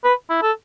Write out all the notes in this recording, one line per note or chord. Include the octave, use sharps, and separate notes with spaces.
B4
E4
A4